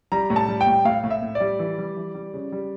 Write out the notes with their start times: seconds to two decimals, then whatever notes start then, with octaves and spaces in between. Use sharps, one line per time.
0.12 G3 A#5
0.30 A2
0.36 A5
0.48 G3
0.61 G5
0.67 A2
0.85 A2 F5
1.04 A2
1.10 E5
1.22 A2
1.35 D5
1.41 G3
1.59 E3
1.78 G3
1.97 E3
2.15 G3
2.34 C#3
2.52 G3